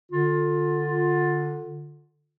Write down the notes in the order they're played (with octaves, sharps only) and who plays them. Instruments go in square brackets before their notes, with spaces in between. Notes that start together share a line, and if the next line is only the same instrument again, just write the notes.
[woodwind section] D3 F4